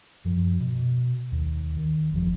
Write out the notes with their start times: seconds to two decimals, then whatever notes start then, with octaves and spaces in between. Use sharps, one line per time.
0.25 F#2 F3
0.60 B2
1.32 D#2
1.76 D#3
2.11 G1 F2 C#3 F3